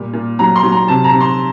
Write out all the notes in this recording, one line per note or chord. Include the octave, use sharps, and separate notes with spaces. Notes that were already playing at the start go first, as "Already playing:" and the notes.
Already playing: A#2 G3
A#2
F#3 A#5
C6
F#3
A#5
C3 A5
A#5
C3
C6